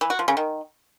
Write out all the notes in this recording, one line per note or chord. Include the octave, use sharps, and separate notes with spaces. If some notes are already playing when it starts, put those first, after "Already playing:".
E3
F#4
F3
C#3
D#3